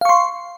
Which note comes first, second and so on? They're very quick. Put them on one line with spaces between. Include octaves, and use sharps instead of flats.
F5 C#6 C6